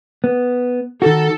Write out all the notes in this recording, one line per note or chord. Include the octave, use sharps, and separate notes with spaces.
B3
D#3 F#4 A4